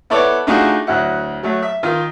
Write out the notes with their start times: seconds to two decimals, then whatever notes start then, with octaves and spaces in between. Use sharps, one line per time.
0.10 B3 E4 A4 C#5 D5
0.47 A3 D4 D#4 F4 F#4 G#4
0.87 D2 F#3 E4 F#5
1.43 F#3 A3
1.62 E5
1.83 D#3 F4